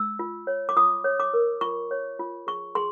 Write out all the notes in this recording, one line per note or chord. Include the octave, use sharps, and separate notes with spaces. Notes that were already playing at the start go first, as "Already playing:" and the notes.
Already playing: E6
F4
C#5
D6
F4 D#6
C#5
D6
A#4
F4 C#6
C#5
F4
G#4 C#6
G#4 C6